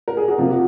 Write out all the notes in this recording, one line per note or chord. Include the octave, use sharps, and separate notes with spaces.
A#4
G#4
F#4
F2 C3 F3 A#3 F4
F#4